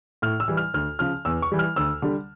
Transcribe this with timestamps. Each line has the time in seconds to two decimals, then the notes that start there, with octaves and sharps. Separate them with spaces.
0.22 A2 F6
0.40 E6
0.48 E3 G3
0.57 F6
0.74 D2 F6
0.99 C#3 F3 F6
1.25 E2 E6
1.42 C#6
1.52 E3 G3
1.59 F6
1.76 D2 E6
2.02 D3 G3